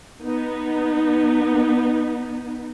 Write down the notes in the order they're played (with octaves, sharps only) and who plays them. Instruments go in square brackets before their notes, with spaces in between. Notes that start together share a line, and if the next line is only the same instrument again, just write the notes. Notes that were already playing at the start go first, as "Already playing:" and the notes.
[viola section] B3 D#4